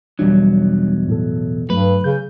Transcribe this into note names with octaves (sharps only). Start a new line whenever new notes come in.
B1 E2 F#3 G3 D4
A2 A4
G2 F#3 A3 B4
C#3 G6